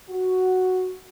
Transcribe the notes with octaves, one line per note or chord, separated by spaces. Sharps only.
F#4